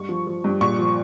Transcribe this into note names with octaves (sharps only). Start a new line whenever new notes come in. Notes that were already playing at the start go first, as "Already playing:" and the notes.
Already playing: G2 C#6
F3
F3
G2
A#2 C#6
F3